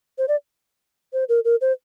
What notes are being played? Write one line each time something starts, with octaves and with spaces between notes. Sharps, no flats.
C5
D5
C5
A#4
A#4
C5